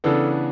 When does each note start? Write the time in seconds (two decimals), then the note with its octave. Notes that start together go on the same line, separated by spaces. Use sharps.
0.04 C#3 E3 B3 D4 A4